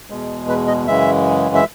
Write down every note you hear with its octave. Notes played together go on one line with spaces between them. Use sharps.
E2 B2 G#3
B4
D#5
F#2 C#3 E3 G#3 E5
E5